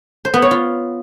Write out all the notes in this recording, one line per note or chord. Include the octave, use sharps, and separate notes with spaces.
C5
B3
C#5
F4